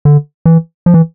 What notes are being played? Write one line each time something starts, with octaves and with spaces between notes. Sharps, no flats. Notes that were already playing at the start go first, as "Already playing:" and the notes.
D3
E3
F3
E3